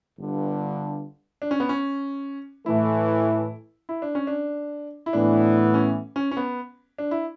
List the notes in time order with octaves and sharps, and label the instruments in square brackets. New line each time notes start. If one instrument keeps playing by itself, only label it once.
[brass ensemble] G1 G2 D3
[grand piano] D4
C#4
B3
C#4
[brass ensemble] A2 E3 A3 [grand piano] E4
[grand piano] E4
D4
C#4
D4
E4
[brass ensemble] A2 E3 B3 [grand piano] D4
[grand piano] C#4
C#4
C#4
B3
D4
E4